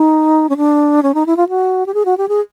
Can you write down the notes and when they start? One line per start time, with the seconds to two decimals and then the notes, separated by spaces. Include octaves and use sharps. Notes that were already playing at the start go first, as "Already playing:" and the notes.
Already playing: D#4
0.49 C#4
0.57 D4
1.03 C#4
1.14 D#4
1.26 E4
1.37 F4
1.49 F#4
1.86 G4
1.94 G#4
2.05 F#4
2.17 G4
2.28 G#4